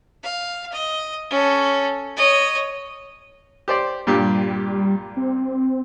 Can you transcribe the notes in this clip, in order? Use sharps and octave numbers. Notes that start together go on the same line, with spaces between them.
F5
D#5
C#4 A4
C#5 D#5
G4 C5 D5
G2 A#2 G3 G4
C4